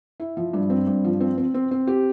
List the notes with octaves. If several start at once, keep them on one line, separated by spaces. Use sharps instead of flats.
E4
F3
G2
C4
G2
F3
C4
C4
C4
C4
G4